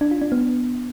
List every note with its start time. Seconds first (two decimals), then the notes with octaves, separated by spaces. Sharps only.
0.01 D4
0.11 F4
0.22 D4
0.32 B3